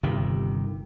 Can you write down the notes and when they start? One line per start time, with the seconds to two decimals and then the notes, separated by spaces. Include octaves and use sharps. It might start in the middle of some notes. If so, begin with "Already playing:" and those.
0.03 G1 C3 D#3